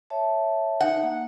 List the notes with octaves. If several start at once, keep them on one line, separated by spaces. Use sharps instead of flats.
C#5 E5 A5
D#4 E5 F#5
A#3